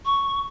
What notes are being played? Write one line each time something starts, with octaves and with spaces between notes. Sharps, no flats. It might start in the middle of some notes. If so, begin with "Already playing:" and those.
C#6